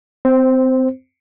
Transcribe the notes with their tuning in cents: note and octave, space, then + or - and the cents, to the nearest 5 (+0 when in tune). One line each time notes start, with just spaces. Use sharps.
C4 -25 C5 +0